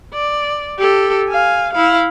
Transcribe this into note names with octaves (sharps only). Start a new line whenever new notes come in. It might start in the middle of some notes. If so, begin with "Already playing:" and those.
D5
G4 A4
F5 G#5
E4 F5